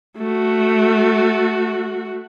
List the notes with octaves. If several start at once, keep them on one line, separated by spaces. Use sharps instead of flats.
A3 F#4